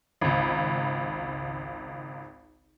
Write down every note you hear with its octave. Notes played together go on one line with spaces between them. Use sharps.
G#1 C#2